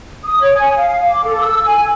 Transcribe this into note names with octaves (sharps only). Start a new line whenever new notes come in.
D#6
C#5
G#5
F5
D6
A4
E6
G#5